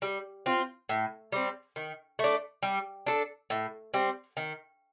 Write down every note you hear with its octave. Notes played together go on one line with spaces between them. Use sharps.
G3
C4 F4
A2
G3 C4
D#3
A3 D4
G3
D4 A4
A2
G3 C4
D#3